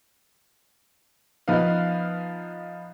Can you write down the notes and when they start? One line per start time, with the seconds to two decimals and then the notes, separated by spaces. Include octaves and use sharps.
1.48 F3 B3 D#4 B4 F5